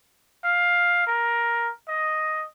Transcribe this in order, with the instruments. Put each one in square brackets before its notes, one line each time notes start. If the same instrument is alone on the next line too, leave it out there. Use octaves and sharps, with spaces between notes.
[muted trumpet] F5
A#4
D#5